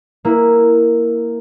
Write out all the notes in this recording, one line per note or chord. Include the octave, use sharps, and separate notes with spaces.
A#3 E4